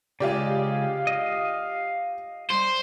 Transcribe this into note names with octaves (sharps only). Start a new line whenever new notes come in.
C#3 G#3 F4 G4 D5
F5
D#5 D#6
G3 C5